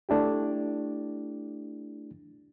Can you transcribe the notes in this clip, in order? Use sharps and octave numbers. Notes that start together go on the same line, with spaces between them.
A3 D4 E4 G4